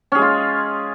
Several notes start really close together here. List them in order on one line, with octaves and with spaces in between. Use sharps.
C#4 G#4 G#3 F4